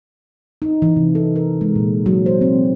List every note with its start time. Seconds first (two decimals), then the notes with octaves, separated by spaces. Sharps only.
0.62 D#4
0.82 E3
0.96 C3
1.15 A4
1.36 A#4
1.61 G#3
1.76 A#2
2.06 F#3
2.26 C5
2.41 C4